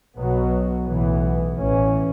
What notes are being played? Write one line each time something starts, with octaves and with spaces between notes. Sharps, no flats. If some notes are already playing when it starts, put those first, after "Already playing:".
B1 B2 F#3 B3
B1 A2 E3 B3
A1 A2 E3 C#4